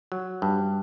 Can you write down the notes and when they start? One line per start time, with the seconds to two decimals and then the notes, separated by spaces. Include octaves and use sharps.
0.12 F#3
0.42 G2